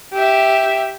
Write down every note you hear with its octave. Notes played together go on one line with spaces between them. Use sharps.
G4 E5